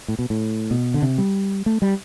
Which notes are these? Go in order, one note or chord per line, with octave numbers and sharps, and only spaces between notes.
A2
B2
A2
B2
D3
C3
G3
A3
G3